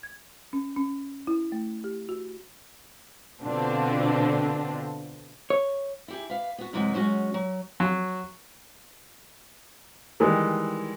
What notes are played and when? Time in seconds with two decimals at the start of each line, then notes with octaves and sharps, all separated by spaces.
0.03 G#6
0.53 C#4
0.76 C#4
1.27 E4
1.52 A3
1.84 G4
2.09 F#4
3.41 B2 D3 C4 D4 F4
5.50 C#5
6.08 E4 G4 G#4
6.30 B4 F5
6.58 B3 F#4
6.73 F#2 C3 E3 G#3 A3 F#5
6.94 F#3 G#3 C#4 F#4
7.34 F#3
7.80 F#3
10.20 D#3 E3 G3 G#3